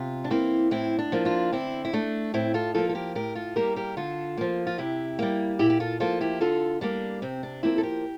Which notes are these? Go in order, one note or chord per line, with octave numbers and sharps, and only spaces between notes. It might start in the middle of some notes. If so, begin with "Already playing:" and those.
Already playing: C3 F4
D4
E3 A#3 C4 E4
A2 C4 E4
D4
F3 A#3
D4 F4
D3 C4 E4
E4
A3 D4
A2 C4 E4
F4 A4
F3 A#3 F4 A4
A4
G4 A#4
A2 G4 A#4
F4 A4
G3 A#3 G4 A#4
G4 A#4
D3 F4 A4
F3 A#3
F4
C3 E4 G4
G3 A#3
A#2 E4 G4
G4
F4 A4
F3 A#3 F4 A4
E4 G4
D3 F4 A4
G3 A#3 D4
C3 C4
D4
F3 A#3 C4 E4
A4
G4 A#4